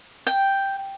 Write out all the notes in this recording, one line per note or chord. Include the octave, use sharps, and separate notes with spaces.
G5